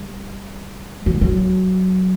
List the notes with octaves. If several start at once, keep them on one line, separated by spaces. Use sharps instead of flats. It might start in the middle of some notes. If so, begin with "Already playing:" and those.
Already playing: G3
F#3
G3
F#3